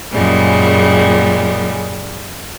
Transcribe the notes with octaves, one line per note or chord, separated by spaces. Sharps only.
F#2 A#2 C#3 G3 G#3